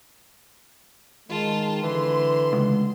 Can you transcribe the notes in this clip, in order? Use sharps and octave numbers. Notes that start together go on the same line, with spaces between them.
D#3 G#3 F4 A5
D3 E3 C6
C#2